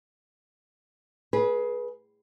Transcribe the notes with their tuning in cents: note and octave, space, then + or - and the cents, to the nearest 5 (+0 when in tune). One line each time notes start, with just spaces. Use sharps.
G#4 +15 B4 -20